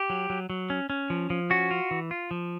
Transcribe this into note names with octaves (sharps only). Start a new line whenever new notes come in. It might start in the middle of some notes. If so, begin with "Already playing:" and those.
Already playing: G4
F#3
F#3
F#3
C#4
C#4
F3
F3
C#4 F#4
F4
E3
F4
F3